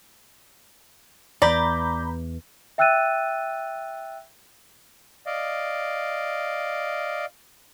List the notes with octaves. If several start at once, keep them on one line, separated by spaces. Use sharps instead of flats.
E2 E3 B3 D5 A#5 B5 G6
E5 G5 E6 F#6 A6 D#7
D5 D#5 F5